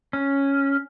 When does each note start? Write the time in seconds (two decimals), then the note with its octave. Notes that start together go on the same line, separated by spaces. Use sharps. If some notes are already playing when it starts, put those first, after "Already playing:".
0.13 C#4